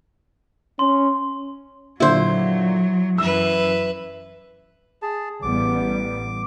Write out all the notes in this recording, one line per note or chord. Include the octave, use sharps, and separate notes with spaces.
C#4 C6
A#2 D3 F#3 E4 C5
F#2 E3 B4 E5 E6
G#4 A5
A1 G3 B3 D6